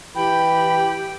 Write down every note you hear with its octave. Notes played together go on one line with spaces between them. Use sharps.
E3 G4 G5 B5